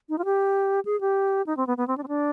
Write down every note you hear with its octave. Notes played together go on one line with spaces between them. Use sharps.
D#4
F4
G4
G#4
G4
D#4
C4
B3
B3
C4
D4
C4
D4